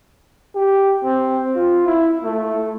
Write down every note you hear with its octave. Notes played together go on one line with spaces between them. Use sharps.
G4
C4
F4
E4
A3